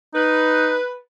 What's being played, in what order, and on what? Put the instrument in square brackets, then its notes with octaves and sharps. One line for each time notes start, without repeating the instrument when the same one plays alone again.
[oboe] D#4 [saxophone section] B4